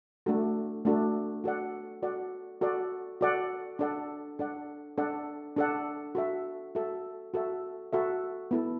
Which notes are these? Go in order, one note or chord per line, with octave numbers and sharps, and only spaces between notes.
A3 D4 F#4 A4
A3 D4 F#4 A4
F#4 A4 D5 F#5
F#4 A4 D5 F#5
F#4 A4 D5 F#5
F#4 A4 D5 F#5
D4 A4 D5 F#5
D4 A4 D5 F#5
D4 A4 D5 F#5
D4 A4 D5 F#5
F#4 A4 E5
F#4 A4 E5
F#4 A4 E5
F#4 A4 E5
B3 E4 A4